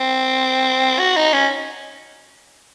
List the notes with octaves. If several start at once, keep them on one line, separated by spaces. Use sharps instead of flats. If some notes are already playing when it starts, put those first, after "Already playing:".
Already playing: C4
F#4
D#4
C#4